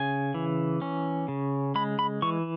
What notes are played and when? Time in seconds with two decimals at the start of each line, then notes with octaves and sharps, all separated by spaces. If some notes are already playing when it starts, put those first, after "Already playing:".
Already playing: C#3 G#5
0.34 E3
0.82 C#4
1.28 C#3
1.75 G#3 B5
1.99 B5
2.22 E3 C#6